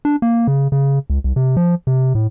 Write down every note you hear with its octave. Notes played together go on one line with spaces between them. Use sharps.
D4
A#3
C#3
C#3
C#2
C2
C3
F3
C3
A2